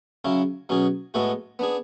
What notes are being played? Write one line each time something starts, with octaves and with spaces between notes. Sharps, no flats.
C#3 F#3 C#4 E4
B2 F#3 C#4 G#4
A2 G#3 B3 F#4 A4
B3 D4 G#4